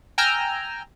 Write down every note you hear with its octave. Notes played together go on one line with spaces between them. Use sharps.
G5 G#5 A#5 E6 F6 G6